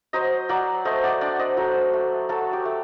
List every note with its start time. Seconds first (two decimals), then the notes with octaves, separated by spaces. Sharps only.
0.13 F#3 C5 D#5
0.49 F#3 D5 F#5
0.85 A3 C5 D#5
1.04 D5 F#5
1.21 D4 D5 F#5
1.39 C5 D#5
1.57 F#3 A4 C5
1.93 A3
2.29 F#3 F#4 A4
2.53 G4
2.65 A3